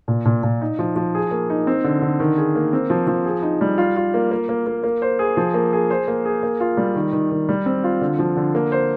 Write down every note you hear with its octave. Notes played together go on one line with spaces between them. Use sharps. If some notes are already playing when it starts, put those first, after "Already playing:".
A#2
A#2
A#2
D#4
F3
F3
G#4
A#3
D#4
C4
D3
D3
D#3
G#4
A#3
C4
F3
F3
G#4
D#4
G3
F4
F4
A#3
A#3
A#3
A#3
A#3
C5
G#4
F3
A#3
G#4
C5
A#3
G#4
A#3
F4
G3
D#3
D#3
D#3
G3
C4
F4
D3
F3
D3
A#3
C5